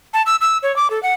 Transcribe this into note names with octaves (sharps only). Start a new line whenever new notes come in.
A5
E6
E6
C#5
D6
A4
F#5